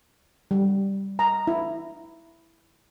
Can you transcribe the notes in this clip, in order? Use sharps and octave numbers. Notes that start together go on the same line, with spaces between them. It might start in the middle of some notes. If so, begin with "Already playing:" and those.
G3
A#5
E4